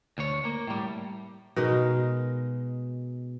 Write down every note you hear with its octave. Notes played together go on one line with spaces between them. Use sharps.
D2 C#5
A#3
A2 G3
B2 G#3 D#4 A#4